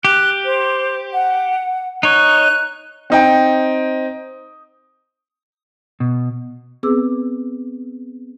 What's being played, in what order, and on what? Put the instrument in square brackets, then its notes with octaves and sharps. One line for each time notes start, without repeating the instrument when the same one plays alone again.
[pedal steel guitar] G4 [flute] F#6
[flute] C5
F#5
[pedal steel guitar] D#4 C#5 [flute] F#6
[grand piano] C4 D#4 G5
[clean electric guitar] B2
[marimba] B3 C4 G#4 B4 D6 E6